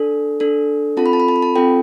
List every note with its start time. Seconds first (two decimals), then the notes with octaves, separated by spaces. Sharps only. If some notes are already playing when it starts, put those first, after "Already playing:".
Already playing: D4 A4
0.40 D4 A4
0.97 C4 F4 A4 A5
1.06 B5
1.13 A5
1.20 B5
1.28 A5
1.36 B5
1.42 A5
1.56 C4 F4 A4 G5